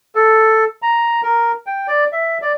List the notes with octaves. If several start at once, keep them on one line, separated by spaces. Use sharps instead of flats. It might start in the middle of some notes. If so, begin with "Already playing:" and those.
A4
A#5
A#4
G5
D5
E5
D5